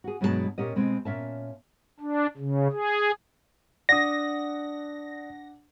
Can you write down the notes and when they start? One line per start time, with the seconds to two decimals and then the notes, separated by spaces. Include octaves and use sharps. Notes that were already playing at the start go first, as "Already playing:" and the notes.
0.04 F#4 G#4
0.21 G2 B2 F#3 G#3 A4 A5
0.58 A#2 C#4 G4 D#5
0.76 B2 G#3 C4
1.05 A#2 C#4 E5 A5
2.00 D4
2.37 C#3
2.72 G#4
3.89 D4 D5 F#5 D#6 A#6